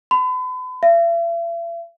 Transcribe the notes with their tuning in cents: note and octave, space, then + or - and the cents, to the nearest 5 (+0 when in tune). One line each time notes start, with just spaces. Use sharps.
B5 +40
E5 +45